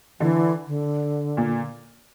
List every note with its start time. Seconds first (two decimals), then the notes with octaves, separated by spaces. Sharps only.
0.20 D3 E3
0.67 D3
1.37 A#2